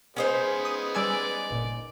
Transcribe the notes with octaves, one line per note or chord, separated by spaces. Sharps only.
G#3 B3 C#4 D#4 C5
D#6
G3 D5 G#5 E6
G1 A#2